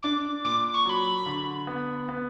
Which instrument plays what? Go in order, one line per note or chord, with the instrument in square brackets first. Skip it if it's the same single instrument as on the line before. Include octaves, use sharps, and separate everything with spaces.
[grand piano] D4 [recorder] D6
[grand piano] A#2 [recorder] D6
[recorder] C#6
[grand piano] F#3 [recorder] B5 C#6
[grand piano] D3
B3
B3